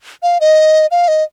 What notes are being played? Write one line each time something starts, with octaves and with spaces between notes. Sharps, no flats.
F5
D#5
F5
D#5